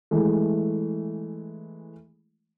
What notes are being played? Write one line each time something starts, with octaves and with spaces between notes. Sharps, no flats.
E3 G#3 A3